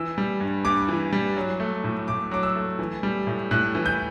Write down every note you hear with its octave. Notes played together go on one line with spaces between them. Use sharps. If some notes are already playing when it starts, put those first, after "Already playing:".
Already playing: E3 E6
G3
G2
G2 D6
E3
G3
F#3
A3
A2
A2 D6
F#3 D6
E6
A3
E3
G3
A2
A2 F#6
E3
G6